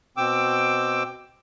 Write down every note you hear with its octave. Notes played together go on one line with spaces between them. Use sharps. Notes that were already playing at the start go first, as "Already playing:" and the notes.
B2 C4 G5 D6 E6